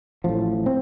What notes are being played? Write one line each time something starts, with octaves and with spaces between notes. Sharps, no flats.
A1 A2 F3
C4